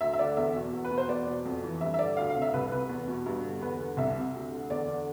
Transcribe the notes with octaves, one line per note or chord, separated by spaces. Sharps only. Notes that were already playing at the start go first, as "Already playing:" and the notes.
D2 E5
E5
D3 D5
E2 E5
B2
E2
B4
B2
C5
E2 D5
B2
F2
E3
G2 E5
E5
D3 D5
D2 F5
F5
C3
E5
C2 B4
C3 B4
E2
B2
G2
D3
E2 B4
D3
C2 E5
C3
D2
D3
E2 D5
D3